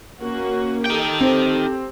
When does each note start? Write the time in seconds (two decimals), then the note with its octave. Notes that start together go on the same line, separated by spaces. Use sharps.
0.21 A#3 C#4 F#4
0.86 D#4 G4 A4 G5
1.21 C4